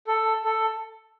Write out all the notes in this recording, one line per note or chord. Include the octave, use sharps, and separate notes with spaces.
A4
A4